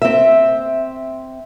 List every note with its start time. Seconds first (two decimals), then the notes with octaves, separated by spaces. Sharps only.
0.02 C4 E5